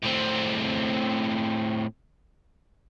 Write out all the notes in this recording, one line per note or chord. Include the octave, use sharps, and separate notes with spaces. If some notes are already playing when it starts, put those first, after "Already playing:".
A2 C4